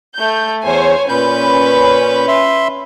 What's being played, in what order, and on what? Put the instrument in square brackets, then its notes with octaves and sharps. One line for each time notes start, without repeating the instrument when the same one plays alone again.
[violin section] A3 G6
[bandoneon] E2 [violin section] C5 C#5 G#5
[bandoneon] A#2 G6 [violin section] C#4 B4
[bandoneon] E5 C6